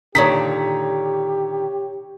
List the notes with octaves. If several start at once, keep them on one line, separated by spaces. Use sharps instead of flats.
A#2 D3 D#3 G4 C#5 B6